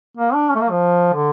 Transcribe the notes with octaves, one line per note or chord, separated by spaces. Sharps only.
A#3
D4
C#4
A3
A#3
F3
D3